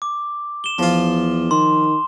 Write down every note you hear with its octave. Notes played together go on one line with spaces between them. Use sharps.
D6
E7 G7
E2 F3 F4
D#3 C6